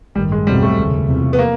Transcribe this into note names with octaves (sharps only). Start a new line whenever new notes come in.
A1 G2 D#3 G3
G#3
E2 B2 F#3 G3 A3 C4
A3
F1 D#2 C#3
E2 C3 F3
B3
A#3